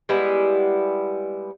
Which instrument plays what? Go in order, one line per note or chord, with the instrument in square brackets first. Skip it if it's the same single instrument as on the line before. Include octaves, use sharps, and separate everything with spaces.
[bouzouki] G3 G#3 B3 E4